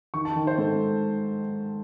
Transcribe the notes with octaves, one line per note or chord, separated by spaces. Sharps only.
D#3 C#6
A5
D#3
C5
G#2 A4